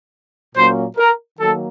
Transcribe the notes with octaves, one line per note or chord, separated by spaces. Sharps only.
A#2 F#3 A#3 C#4 C5
A#4
D#3 F#3 A#3 A4